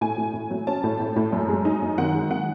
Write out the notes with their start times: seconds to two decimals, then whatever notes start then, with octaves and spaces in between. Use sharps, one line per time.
0.01 A2 G#5
0.18 A2
0.34 A2
0.51 F#3
0.67 C#4 A5
0.84 A2
1.00 A2
1.16 A2
1.33 F#2
1.49 G#3
1.65 D#4
1.82 F#2
1.98 D#3 F#5
2.15 G#3
2.31 D#3 F#5